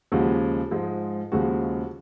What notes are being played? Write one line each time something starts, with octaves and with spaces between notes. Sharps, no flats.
D#2 C#3 F3 G#3 F#4
G#2 F3 G#3
D#2 C#3 F3 G#3 F#4